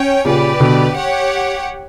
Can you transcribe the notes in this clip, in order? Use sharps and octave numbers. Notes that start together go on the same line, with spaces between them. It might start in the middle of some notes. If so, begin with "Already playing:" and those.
Already playing: C#4 C#5 G5
A#2 C#3 G4 B4 D5
B2 D3
G4 C#5 F#5